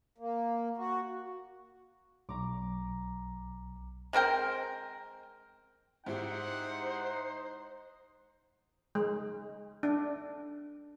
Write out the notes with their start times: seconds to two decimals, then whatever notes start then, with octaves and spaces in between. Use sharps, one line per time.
0.18 A#3
0.77 F#4
2.29 B1 A#5 D6
4.13 G#3 C4 A#4 G5
6.06 G#2 D#4 E4 G4 C5 F#5
8.95 G#3
9.83 D4